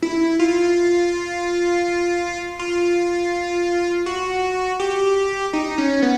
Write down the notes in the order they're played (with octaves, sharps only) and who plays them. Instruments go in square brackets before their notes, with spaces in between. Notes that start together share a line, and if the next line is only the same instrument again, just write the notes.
[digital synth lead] E4
F4
F4
F#4
G4
D#4
C#4
B3